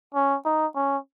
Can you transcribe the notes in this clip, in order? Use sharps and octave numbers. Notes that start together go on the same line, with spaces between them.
C#4
D#4
C#4